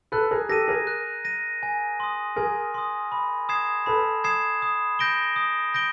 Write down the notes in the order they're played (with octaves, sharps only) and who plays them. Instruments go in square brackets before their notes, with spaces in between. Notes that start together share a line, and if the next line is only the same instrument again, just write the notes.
[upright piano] A4 B4 [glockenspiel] F#6
[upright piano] G#4 A#4
[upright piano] G4 A4 [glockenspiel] A#6 D#7
[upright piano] G#4 A#4
[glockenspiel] F#6
A#6 D#7
G#5
C6 D#6
[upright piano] G#4 A#4 [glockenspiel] G#5
[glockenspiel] C6 D#6
B5
D#6 G#6 C7 E7
[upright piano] A4 B4 [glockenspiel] B5
[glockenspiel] D#6 G#6 C7 E7
D#6
G6 A#6 D7 G7
D#6
G6 A#6 D7 G7